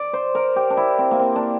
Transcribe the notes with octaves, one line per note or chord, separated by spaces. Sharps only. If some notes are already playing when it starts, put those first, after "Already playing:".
Already playing: D5
C5
A#4
G4
D4
E4
C4
A#3
C4
D4